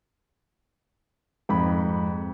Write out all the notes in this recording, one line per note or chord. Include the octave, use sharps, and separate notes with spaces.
F2 G#2 B5